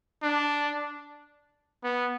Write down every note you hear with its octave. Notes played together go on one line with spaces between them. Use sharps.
D4
B3